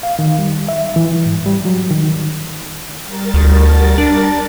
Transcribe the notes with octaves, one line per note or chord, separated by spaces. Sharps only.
F5
D#3
G3
E5
E3
G#2
G3
F#3
D#3
G3 A#4 A6
D2
D4